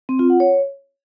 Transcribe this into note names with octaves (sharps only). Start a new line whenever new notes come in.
C4
F4
F#5
C#5